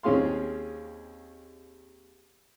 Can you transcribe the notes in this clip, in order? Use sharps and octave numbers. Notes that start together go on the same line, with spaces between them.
D#2 C4 C#4 G#4 F5 C6